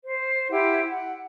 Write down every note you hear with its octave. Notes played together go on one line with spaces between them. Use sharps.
C5
E4 G4 F#5 C6
F#5